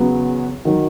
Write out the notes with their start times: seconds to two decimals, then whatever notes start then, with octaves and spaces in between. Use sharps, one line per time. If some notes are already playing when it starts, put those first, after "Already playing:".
Already playing: E2 C#3 F#3 B3
0.65 D#3 F#3